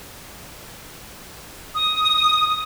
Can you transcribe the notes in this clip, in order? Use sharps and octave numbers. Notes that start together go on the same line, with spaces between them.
D#6